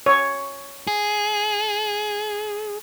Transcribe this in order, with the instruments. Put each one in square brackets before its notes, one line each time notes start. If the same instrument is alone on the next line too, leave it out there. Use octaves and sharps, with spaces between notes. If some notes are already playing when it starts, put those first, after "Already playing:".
[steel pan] C#5
[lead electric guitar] G#4